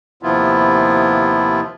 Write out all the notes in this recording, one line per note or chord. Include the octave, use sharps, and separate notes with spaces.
D#2 C3 F3 B3 E4 F4